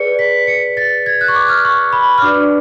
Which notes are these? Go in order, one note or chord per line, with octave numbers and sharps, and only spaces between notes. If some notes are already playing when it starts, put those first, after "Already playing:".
Already playing: G#4 B4 D5 C#7
B6
C#7
A6
G#6
F#6
C#6
D6
F6
C#6
B5
F6
D4 F#4 B4 D5 D6